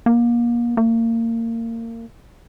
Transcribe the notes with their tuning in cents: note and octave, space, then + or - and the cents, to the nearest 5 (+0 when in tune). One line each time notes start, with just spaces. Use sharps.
A#3 +30
A#3 -30